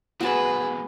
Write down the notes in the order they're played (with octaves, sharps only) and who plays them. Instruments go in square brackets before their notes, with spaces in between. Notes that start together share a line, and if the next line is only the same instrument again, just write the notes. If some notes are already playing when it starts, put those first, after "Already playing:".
[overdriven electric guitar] G#2 B2 [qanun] F#4 A5 [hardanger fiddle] G#4 B4